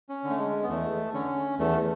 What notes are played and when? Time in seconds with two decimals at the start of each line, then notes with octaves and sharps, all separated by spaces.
0.09 C#4
0.24 D3
0.30 A3
0.38 G#3
0.63 B3
0.69 E2 A3
1.14 D3 C#4
1.59 E2 A3